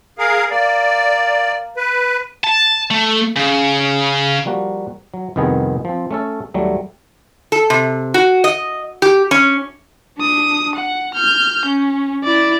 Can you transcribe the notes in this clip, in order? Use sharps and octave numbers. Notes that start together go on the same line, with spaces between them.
G#4 A#4 F5
A#3 D5
B4
A5
A3
C#3
F3 G3 A#3 F#4
F#3
C2 F2 D#3 B3 G#4
F3 C4
A3 C#4 A4
D#2 F#3 G3 A3
A4
C3
F#4
D#5
G4
C#4
D4 D#6
F#5
F6 G6
C#4
E4 D5